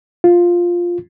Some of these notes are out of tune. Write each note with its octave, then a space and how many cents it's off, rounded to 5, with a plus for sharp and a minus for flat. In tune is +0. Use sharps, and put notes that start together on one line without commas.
F4 +5